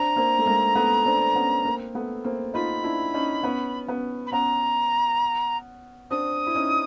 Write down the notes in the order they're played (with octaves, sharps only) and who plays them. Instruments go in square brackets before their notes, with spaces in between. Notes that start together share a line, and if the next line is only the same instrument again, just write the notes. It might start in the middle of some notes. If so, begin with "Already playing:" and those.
Already playing: [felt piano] C4 D4 [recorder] A#5
[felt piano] A#3 C4
A3
G#3 A#3
A3 B3
C4 D4
B3 C#4
A#3 C4
A3 B3
A#3 C4
[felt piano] D#4 F4 [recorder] B5
[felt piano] D4 E4
C#4 D#4
B3 C#4
B3 C#4
[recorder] B5
[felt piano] B3 C#4 [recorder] A#5
[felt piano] C4 D4 [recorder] D#6
[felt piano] E4
C#4 D#4